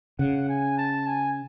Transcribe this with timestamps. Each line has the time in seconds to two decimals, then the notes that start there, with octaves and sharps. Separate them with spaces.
0.19 C#3 F#5
0.49 G#5
0.78 A5
1.07 G#5